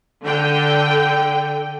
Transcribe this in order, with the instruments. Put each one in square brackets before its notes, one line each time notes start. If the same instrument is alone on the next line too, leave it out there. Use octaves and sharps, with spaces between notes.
[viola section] D3 G5